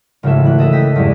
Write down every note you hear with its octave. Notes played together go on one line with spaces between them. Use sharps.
G#1 C#3 E3 A3 E5
E3 F#6
A4 D#5 E5
G5 D#6 A#6 B6
E2 G2 G#3